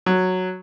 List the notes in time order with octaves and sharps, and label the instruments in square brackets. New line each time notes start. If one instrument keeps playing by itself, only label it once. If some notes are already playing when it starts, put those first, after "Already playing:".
[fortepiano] F#3